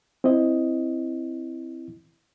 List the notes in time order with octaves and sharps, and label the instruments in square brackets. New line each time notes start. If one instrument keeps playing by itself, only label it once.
[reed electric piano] C4 E4 D#5